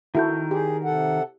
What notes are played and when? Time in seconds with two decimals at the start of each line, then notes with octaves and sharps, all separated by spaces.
0.15 D#3 E4 F#4 A4 A#4 G6
0.51 G4 G#4
0.84 C3 A4 F#5